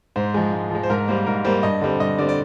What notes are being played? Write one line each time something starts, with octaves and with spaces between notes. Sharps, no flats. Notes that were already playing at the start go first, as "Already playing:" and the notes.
G#2 C5
F3 G#3
G#2
F3 G#3
C5
G#2 A#4
G3 A#3 C5
G#2 A#4
G3 A#3 C5
G2 D#5
D3 G3 C4
G2 D#5
D3 G3 C4 D5
D5